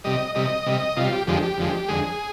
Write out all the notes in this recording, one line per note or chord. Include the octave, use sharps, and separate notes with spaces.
C3 G3 D#5
C3 G3 D#5
C3 G3
C3 G3 F4
G4
F2 D3 F3 G#3 G4
G4
F2 D3 F3 G#3
F2 D3 G#3 G#4